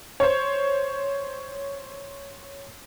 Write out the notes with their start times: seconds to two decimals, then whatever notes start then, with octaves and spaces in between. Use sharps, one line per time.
0.20 C5 C#5